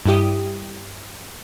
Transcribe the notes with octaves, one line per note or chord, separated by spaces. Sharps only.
G2 E4 G4 D#6